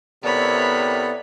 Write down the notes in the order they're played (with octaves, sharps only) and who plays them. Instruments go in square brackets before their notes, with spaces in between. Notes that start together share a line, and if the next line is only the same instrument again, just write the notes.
[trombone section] C3 E4 A#4 [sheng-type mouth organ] B3 A4 [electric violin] C#5 B5 [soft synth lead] D5